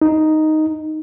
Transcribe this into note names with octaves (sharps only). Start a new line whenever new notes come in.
D#4